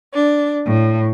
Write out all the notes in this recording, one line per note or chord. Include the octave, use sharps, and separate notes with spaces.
D4
A2